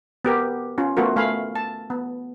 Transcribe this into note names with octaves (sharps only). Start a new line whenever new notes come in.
B3 G4 A#4
C#4 F4
A3 B3 F4 F#4 A#4
A3 F5 G#5 B5
A5
B3